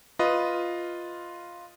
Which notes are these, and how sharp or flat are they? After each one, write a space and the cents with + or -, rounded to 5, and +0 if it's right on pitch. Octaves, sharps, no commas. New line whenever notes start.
F4 +0 B4 +0 D#5 +0